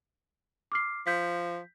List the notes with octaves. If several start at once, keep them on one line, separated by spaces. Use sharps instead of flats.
D6 F6 C7
F3 G6 B6